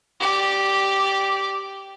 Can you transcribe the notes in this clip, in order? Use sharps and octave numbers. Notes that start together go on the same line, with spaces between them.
G4 D5